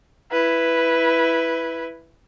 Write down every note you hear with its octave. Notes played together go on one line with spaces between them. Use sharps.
E4 B4